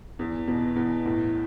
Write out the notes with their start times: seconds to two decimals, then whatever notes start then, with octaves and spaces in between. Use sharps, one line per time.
0.19 E2
0.48 B2
0.76 E2
1.05 A2